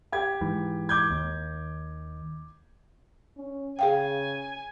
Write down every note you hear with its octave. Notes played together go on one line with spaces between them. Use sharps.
G4 G#6
G#2 E3
D6 G6 G#6
D#2
C#4
C#3 G#4 F5 G5 G#5